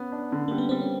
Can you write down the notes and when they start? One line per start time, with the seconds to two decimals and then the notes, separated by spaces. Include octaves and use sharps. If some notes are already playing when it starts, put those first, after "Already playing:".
Already playing: B3 C#4
0.12 D4
0.32 D3
0.48 G3 A#3
0.58 B3
0.69 G3 C4
0.80 C#4